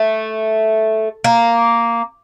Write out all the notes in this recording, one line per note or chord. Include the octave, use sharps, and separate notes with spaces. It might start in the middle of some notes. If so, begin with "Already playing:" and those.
Already playing: A3
A#3